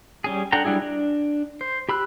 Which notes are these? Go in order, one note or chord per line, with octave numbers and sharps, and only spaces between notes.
G3 C#4 G#4
D4 A4 F#5 G5 A#5
F#3 G3 D4 E4 G#4
D4
C5
G4 B5 E6 F#6